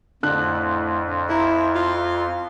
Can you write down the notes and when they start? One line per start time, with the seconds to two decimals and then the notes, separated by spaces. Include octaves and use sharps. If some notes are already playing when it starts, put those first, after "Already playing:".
0.23 F2 A2 D3 F#6
1.29 E4 A#5
1.75 F4